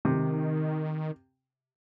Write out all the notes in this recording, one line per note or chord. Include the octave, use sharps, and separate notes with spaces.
C3 D#3